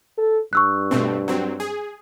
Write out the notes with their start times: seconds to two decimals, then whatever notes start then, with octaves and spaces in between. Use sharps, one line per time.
0.18 A4
0.53 G2 C#6 E6 F#6
0.91 B2 A3 C4
1.28 F#3 C4
1.60 G#4